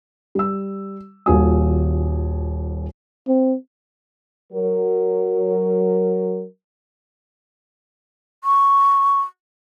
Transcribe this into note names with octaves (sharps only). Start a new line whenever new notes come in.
G3 E6
D#1 D#2 F4 F#4 G#5 D#6
C4
F#3 A#4
C#6